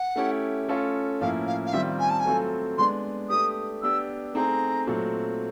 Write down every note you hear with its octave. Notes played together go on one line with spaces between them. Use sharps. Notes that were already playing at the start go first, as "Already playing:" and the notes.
Already playing: F#5
A3 C#4 E4 G4
A3 C#4 F4 A4
A2 F3 A#3 C#4 E4 F5
F5
F5
D#3 G3 C4 F4 E5
G#5
A5
G#5
F#3 A3 C4 F4 A4
G#3 B3 D4 C6
A3 D4 G4 B4 D#6
B3 D4 G4 E6
A3 C4 D#4 G#4 A#5
A#2 F#3 A3 C4